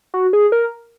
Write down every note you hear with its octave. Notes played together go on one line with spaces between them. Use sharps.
F#4
G#4
A#4